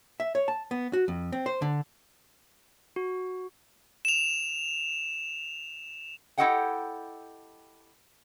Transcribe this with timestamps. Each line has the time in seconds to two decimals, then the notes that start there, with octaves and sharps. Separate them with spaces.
0.20 E5
0.35 C#5
0.48 A5
0.71 B3
0.93 F#4
1.08 F2
1.32 C4
1.46 C5
1.62 D3
2.96 F#4
4.05 E7 F7
6.38 E4 G4 A4 D#5 F#5 G5